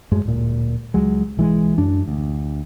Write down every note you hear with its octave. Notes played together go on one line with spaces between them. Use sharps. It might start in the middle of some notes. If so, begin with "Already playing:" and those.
F#2 A2 G#3
D1 A#2
C#2 F#3 G#3
B1 E3 G#3
F#2 D4
D2